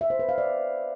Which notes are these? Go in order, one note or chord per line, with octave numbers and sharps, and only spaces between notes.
E5
C5
B4
F5
D5